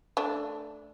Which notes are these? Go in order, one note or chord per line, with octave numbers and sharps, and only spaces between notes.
A3 D4